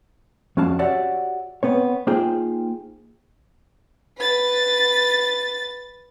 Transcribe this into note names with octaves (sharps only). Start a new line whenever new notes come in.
F2 C#4 F#4 F5 A5
F#4 G4 C#5 D5 E5 F#5
B3 C4 C#5
A#3 D#4 F4 G#4 C5 G5
B4 A6